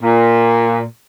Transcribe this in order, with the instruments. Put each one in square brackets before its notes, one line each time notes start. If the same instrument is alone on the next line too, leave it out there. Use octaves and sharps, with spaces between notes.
[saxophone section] A#2